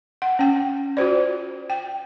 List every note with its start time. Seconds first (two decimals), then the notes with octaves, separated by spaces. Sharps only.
0.22 F#5
0.39 C#4 G5
0.97 F4 F#4 C5 D5
1.70 G5